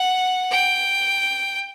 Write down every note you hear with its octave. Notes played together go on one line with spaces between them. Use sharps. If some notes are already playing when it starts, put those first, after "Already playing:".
Already playing: F#5
G5